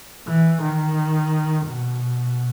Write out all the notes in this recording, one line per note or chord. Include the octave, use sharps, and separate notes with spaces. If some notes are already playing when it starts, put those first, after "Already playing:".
E3
D#3
B2